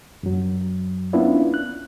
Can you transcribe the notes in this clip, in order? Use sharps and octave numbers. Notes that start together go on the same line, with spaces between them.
F#2 F#3
A#3 B3 C#4 D4 E4 F4
F#6